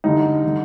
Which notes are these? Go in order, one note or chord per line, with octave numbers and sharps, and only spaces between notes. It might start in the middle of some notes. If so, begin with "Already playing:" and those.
G2 D3 D#4
D3